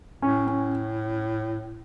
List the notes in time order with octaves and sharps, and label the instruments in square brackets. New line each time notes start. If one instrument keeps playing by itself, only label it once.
[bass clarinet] A2 [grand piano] C#4
[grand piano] C#4